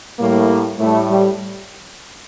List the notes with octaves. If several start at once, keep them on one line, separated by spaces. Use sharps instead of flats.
A2 G3 A#3
A2 G3 A3
G3